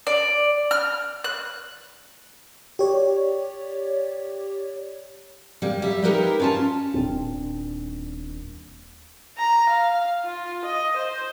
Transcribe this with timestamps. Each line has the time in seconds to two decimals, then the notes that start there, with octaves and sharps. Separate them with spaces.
0.07 D5
0.71 F6
1.24 F#6
2.79 G4 C#5 D5
5.62 G3 A#3
5.82 G3 E5
6.03 D#4 E4 G4 A#4 B4
6.40 C#4 F4 A5
6.94 D#1 A#2 C4 D4
9.38 A#5
9.70 F5
10.24 F4
10.65 D#5
10.97 C5